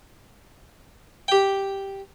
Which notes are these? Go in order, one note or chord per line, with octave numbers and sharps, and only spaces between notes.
G4 G5